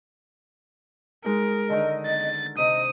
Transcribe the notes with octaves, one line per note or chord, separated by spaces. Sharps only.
G#3 D#4 A#4
D3 D#3 D#5
A6
C3 D#5 D#6